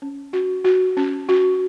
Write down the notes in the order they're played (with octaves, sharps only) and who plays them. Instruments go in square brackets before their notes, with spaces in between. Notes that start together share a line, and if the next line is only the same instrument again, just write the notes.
[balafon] C#4
F#4
F#4
C#4
F#4